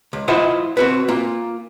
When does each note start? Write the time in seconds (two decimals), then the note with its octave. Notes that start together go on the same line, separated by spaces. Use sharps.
0.13 C#2
0.28 E4 F4 C5 D#5 E5 F#5
0.77 C4 F#4 B4
1.08 A#3 F4